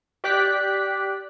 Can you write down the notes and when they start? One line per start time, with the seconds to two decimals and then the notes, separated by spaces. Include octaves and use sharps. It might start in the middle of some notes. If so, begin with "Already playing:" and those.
0.24 G4 D5 D6 F#6 B6